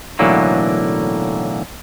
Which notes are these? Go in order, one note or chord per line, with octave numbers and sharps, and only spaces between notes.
B1 A2 D3 E3 F#3 A#3